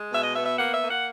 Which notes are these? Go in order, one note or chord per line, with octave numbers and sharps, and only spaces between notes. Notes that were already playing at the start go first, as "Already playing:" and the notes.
Already playing: G#3
B2 E5
D#5
B3 E5
E5
A#3 F#5
E5
A#3
F#5